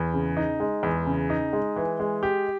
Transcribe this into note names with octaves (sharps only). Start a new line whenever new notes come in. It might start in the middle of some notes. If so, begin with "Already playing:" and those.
Already playing: E2
C#3
D#4
G#3
E2
C#3
D#4
G#3
E3
G#3
G4